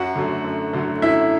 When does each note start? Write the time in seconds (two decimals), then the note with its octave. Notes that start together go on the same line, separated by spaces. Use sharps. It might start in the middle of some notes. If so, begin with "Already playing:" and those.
Already playing: F#2 F#4 F#5
0.16 D3 F#3 A3
0.44 F#2
0.73 D3 F#3 A3
1.02 F#2 E4 E5